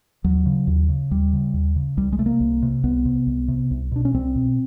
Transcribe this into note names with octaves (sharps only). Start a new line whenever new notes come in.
D#2 F#3
C#3
D#2
C#3
D#2 G3
C#3
D#2
C#3
C2 G3
G#3
C3 A3
A#3
C2
C3
C2 B3
C3
C2
C3
C2
B2 D4
C#4
C2 C4
B2